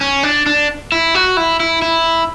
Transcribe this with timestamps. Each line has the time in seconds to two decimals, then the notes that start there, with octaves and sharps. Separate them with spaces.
0.01 C#4
0.23 D4
0.46 D4
0.92 E4
1.15 F#4
1.37 E4
1.60 E4
1.82 E4